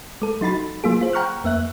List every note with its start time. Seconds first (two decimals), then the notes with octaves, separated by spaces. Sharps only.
0.22 G#3 A4
0.41 F#3 D#4 F#4 B5 A6
0.84 F#3 A#3 F4 G#4
1.01 F4 C5
1.13 F#5 G5 A#5 C#6 F6 F#6
1.44 F2 A#3 E5 F#6